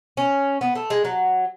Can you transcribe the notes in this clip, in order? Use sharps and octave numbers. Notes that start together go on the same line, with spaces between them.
C#4
B3
A3
G#3
F#3